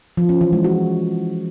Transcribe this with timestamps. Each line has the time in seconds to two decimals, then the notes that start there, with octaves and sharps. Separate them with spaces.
0.17 F3
0.29 C#4
0.41 E3
0.53 G#3
0.64 F#4